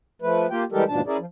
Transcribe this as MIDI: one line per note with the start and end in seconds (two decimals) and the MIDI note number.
0.22 0.47 53
0.22 0.47 57
0.22 0.47 71
0.51 0.64 58
0.51 0.64 65
0.51 0.64 67
0.51 0.64 79
0.72 0.84 52
0.72 0.84 55
0.72 0.84 56
0.72 0.84 67
0.72 0.84 69
0.72 0.84 70
0.89 1.01 39
0.89 1.01 44
0.89 1.01 47
0.89 1.01 53
0.89 1.01 62
0.89 1.01 81
1.07 1.17 61
1.07 1.17 64
1.07 1.17 68
1.07 1.17 70
1.07 1.17 74
1.19 1.26 53